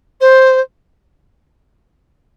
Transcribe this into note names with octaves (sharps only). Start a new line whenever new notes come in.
C5